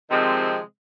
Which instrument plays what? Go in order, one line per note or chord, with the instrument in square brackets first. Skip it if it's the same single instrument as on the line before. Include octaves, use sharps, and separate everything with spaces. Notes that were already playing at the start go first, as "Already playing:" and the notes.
[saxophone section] C3 D#3 F3 G#3 C4